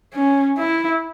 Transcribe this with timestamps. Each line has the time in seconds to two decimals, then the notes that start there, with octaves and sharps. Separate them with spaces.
0.14 C#4
0.58 E4